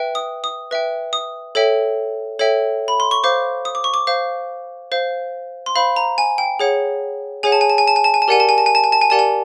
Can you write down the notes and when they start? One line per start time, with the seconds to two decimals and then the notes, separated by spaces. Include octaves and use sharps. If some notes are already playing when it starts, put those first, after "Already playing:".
Already playing: B4 E5 G5
0.15 D#6
0.44 D#6
0.71 B4 E5 G5
1.13 D#6
1.55 A4 C#5 E5 G5
2.39 A4 C#5 E5 G5
2.88 B5
3.00 C6
3.11 C#6
3.24 C5 F5 D6
3.65 D#6
3.75 D6
3.84 C#6
3.94 D6
4.07 C5 F5
4.92 C5 F5
5.66 C6
5.76 C5 F5 B5
5.96 A#5
6.18 G#5
6.38 G5
6.59 G#4 C#5 F#5
7.43 G#4 C#5 F#5 G#5
7.52 A5
7.61 G#5
7.70 A5
7.78 G#5
7.87 A5
7.96 G#5
8.04 A5
8.14 G#5
8.22 A5
8.28 G4 A#4 D5 F#5 G#5
8.40 A5
8.49 G#5
8.58 A5
8.66 G#5
8.75 A5
8.84 G#5
8.92 A5
9.01 G#5
9.10 G4 A#4 D5 F#5 A5
9.19 G#5